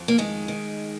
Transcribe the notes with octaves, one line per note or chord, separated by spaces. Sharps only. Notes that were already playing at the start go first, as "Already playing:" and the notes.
Already playing: F2
A#3
D#3 G#3
D#3